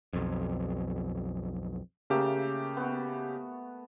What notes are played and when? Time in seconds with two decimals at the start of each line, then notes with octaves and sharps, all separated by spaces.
0.13 B1 F2
2.10 C#3 A3 A#3 G4 E5
2.77 B3 F#4